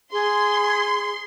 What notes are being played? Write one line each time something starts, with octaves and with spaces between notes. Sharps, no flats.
G#4 C6